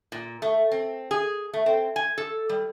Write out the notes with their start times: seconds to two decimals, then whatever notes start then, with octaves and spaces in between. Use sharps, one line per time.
0.12 A#2
0.42 A3
0.71 C4
1.11 G#4
1.53 A3
1.66 C4
1.96 G#5
2.18 A4
2.49 G3